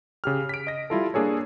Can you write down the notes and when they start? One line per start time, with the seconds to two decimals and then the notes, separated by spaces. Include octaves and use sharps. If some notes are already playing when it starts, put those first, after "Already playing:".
0.24 C#3 G4 F6
0.49 B6 D7
0.67 D#5 A#6
0.90 G3 E4 F4 A4
1.14 A#3 D4 G#4 A4 C#5